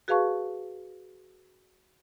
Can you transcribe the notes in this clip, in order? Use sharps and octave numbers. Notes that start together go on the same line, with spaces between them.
F#4 G#4 B4 F5 A5 C#6